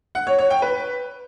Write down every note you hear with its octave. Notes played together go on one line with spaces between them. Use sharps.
F#5
C#5
C#5
G5
B4